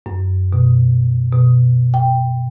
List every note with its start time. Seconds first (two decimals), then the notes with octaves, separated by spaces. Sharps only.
0.06 F#2
0.53 B2
1.32 B2
1.94 G5